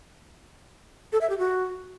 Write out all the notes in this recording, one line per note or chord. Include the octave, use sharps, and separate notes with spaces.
A4
E5
G4
F#4